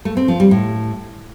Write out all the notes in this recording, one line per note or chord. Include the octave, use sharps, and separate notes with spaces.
A3
C4
F3
G3
A2